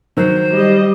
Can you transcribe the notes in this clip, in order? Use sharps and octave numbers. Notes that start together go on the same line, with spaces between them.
D#3 F#3 C5
G3 D#5